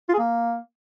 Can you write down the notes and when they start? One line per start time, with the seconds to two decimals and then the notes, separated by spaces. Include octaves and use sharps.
0.09 F4
0.14 G#4
0.19 A#3